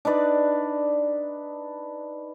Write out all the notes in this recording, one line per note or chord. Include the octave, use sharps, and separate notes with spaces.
D4 D#4 B4 D5